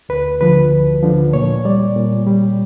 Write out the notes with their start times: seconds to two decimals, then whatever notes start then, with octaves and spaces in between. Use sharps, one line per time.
0.09 D2 B4
0.41 D3 F3 B4
0.72 D2
1.03 D3 F3
1.33 A#2 C#5
1.65 G3 D5
1.96 A#2
2.27 G3